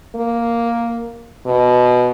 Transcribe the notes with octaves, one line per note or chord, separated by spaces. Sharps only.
A#3
B2